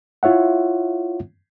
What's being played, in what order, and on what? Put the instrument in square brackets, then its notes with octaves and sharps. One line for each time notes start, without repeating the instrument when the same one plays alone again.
[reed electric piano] E4 F4 C#5 E5 F#5